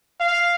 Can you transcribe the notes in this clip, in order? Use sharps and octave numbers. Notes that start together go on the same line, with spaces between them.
F5